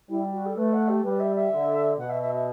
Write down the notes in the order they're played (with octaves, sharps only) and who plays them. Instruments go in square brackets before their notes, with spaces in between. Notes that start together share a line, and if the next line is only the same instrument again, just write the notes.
[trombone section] G3 [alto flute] E4
[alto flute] F#4
A4
[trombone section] A3 [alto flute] B4
[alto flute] F#5
G4
[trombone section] G3 [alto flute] B4
[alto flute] E5
E5
[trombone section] D3
[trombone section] B2 [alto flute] F#5
[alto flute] E5
E5
E5